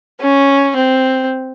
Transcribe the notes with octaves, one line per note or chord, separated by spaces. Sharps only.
C#4
C4